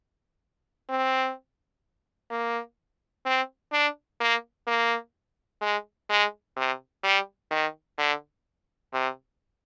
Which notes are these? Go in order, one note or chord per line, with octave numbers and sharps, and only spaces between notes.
C4
A#3
C4
D4
A#3
A#3
G#3
G#3
C3
G3
D#3
D3
C3